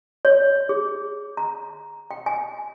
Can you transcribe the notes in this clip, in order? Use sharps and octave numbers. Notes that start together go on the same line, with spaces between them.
C#5
G#4
A#5
G5
G#5